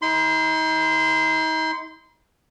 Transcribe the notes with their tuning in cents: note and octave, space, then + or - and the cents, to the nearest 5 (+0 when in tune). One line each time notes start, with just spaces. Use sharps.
D#4 +35 C6 -25